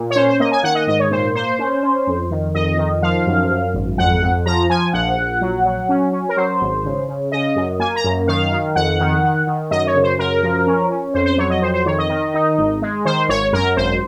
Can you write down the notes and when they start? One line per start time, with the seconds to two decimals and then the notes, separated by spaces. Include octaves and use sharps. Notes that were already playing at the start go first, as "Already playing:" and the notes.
Already playing: A#2
0.11 C#5
0.16 C#4 C5
0.28 C5
0.40 A#3 D#5
0.52 G#5
0.64 D#3 F#5
0.75 D#5
0.87 G#2 D#5
0.99 C#5
1.11 A#2 C5
1.35 A#3 C5
1.59 C#4
1.83 C#4
2.07 F2
2.31 D#3
2.55 F2 D#5
2.78 D#3
3.02 F3 F5
3.27 F#2
3.50 F#2
3.74 G#1
3.98 F2 F#5
4.22 F2
4.46 F3 A#5
4.70 F3 G#5
4.93 A#1 F#5
5.17 A#1
5.41 F#3
5.65 F#3
5.89 C#4
6.13 C#4
6.29 A#4
6.37 F#3 C5
6.61 G#1
6.85 C#3
7.08 C#3
7.32 C#3 D#5
7.56 F#2
7.79 A#3 G#5
7.96 A#5
8.04 F#2
8.27 D#3 F5
8.52 D#3
8.75 F2 F#5
9.00 D#3
9.23 D#3
9.47 D#3
9.71 F#2 D#5
9.87 C#5
9.95 C#3
10.03 C5
10.18 F#2 A#4
10.43 F3
10.67 C#4
10.90 C#4
11.14 F2 C5
11.26 C5
11.38 F#3 C#5
11.50 D#5
11.62 F2 C5
11.74 C5
11.86 D#3 C#5
11.98 D#5
12.10 D#3
12.34 D#4
12.58 G#1
12.82 G#3
13.05 D#3 C5
13.29 G#1 C#5
13.53 F#2 A#4
13.77 G#1 C5